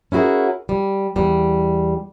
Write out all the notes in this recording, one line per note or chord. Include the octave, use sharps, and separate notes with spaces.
C#4 E4 F#4 G#4 A#4
G3
E2 G3